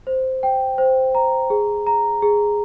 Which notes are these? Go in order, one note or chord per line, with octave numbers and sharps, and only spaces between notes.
C5
G5
C5
A#5
G#4
A#5
G#4